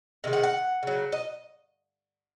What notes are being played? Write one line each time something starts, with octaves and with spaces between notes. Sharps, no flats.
C3 D#3 G#3
F#5
F#5
C#3 F#3
D#5